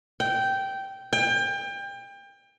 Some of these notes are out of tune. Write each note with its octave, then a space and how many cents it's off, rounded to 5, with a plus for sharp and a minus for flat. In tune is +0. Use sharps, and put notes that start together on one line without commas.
G5 -10
G5 +30